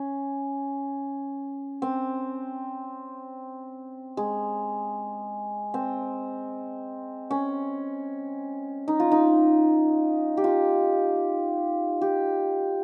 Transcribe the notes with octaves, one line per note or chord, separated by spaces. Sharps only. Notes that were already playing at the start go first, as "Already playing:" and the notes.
Already playing: C#4
C4
G#3
C4
C#4
D#4
F4
D#4
G4
F4
G4